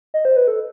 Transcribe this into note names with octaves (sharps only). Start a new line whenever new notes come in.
D#5
C5
B4
A4